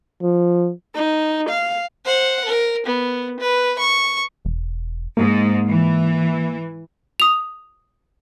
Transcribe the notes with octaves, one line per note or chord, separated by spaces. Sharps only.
F3
D#4
F5
C5 F#5
A#4
B3
B4
C#6
E1
G#2 A#3
E3
D#6 F7